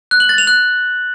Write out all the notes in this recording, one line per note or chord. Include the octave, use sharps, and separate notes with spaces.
F#6
F#7
A6
F7
F#6